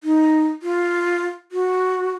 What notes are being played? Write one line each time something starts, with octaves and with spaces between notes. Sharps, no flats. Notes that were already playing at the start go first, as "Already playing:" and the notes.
D#4
F4
F#4